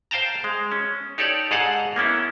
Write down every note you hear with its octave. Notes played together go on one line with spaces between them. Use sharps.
C5 F5 G5 A5 A#5
G#3
C#4
D#4 G4 A4 C#5 D5
G#2 G#4 A4 D#5 F5 F#5
A#3 B3 C#4 E4